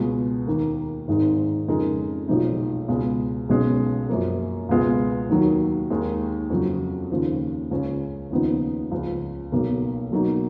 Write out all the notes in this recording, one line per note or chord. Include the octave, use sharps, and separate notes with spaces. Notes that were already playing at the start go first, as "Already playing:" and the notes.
Already playing: C#2 B2 G#3
D#2 D#3 A#3
G#1 G#2 D#3 G#3 D#4
F2 C#3 G#3 D#4 A#4
B1 A#2 F3 G#3 D#4
C#2 B2 G#3
B1 B2 G#3 C#4
F#2 F3 A#3
C#2 B2 G#3 B3 F4
D#2 D#3 F#3
D#2 D#3 G#3
F2 C#3 F#3
D#2 C#3 F3
C#2 C#3 G#3 C#4
D#2 C#3 F3 B3 D#4
C#2 C#3 F3
B1 B2 A#3
B2 F#3 A#3 D#4